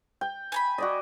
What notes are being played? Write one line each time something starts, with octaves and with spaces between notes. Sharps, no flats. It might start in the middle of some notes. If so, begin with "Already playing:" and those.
G5
G#5 A#5 B5
F#4 D5 D#5